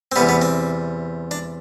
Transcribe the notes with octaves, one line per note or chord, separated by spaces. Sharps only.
C4
E2 C3 G3 B3
B3
C4
D4